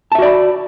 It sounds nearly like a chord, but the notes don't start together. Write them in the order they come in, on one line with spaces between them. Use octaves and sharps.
A5 E5 F#4 D5 B5